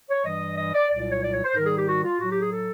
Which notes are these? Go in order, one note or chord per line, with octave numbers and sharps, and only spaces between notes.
C#5
G2 E3 G3 D#5
D#5
D5
C2 A#2 F#3 D5
D5
C#5
D5
C#5
C5
G#2 D#3 G3 A#4
G#4
G4
F#4
F4
A2 F#3 F#4
G4
G#4
A4